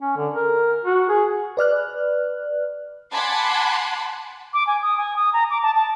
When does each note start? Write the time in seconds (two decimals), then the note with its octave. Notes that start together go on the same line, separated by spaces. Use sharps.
0.01 C#4
0.17 D3
0.34 A#4
0.85 F#4
1.09 G#4
1.57 B4 D5 F6 F#6
3.13 F#5 G#5 A5 B5 C6 D6
4.54 D6
4.67 G#5
4.82 D#6
4.98 G#5
5.16 D#6
5.33 A#5
5.50 D6
5.63 A5
5.75 A5